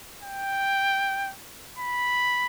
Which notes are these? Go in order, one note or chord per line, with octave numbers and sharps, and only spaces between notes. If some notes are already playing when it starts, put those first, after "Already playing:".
G5
B5